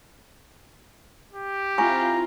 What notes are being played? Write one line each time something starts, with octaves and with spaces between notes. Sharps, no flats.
G4
C4 E4 F4 G#5 A#5 C#6